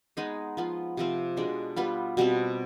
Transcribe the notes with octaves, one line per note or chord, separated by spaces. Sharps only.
G#3 B3 D#4 G#4
F3 B3 F4
C3 F3 C4 F4
B2 G#3 D4
G3 B3 F4 B4
B2 G3 C4